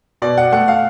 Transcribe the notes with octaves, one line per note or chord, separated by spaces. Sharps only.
B2 D5
F#5
A3 F#5
F5